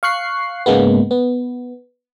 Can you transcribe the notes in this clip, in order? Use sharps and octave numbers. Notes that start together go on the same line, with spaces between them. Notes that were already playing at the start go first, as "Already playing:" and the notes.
F5 C#6 F#6 C7
G#2 C#3 G#3 A#3 B3
B3